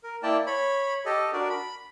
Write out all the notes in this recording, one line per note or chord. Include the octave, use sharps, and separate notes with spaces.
A#4
A#3 E4 D5 G5 A5
C#5 B5
G4 A4 D#5
D4 F#4 A#4 D5
B5